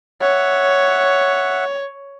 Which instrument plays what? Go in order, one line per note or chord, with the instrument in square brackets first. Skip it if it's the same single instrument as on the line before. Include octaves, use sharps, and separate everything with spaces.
[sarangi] C#5 [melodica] E5 F#5